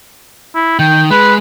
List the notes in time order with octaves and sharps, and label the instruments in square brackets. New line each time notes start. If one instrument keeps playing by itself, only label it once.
[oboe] E4
[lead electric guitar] D#3 [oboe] G5
[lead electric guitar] G#3 [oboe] B4